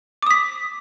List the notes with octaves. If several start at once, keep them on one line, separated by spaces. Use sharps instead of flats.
D6 D#6 B6